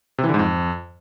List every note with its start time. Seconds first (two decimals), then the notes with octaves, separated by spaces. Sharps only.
0.18 C3
0.24 E3
0.29 D3
0.34 G#2
0.39 F2